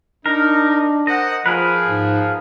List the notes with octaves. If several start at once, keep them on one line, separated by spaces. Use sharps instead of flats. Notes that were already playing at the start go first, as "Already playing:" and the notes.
D4 D#4 A#4
A#4 C5 D#5 F#5
F3 G#4 A#4 B4
G#2